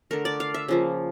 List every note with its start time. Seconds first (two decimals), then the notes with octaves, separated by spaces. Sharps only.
0.11 D3 A3 A#4
0.25 D5
0.40 F5
0.54 E5
0.68 C#3 F3 A#3